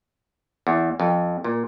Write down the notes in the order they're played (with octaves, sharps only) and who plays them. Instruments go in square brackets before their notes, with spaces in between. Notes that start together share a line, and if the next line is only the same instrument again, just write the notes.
[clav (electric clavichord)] E2
F2
A#2